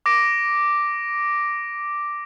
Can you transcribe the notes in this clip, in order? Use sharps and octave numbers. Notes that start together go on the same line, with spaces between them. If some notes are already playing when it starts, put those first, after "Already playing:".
D6 A#6 D7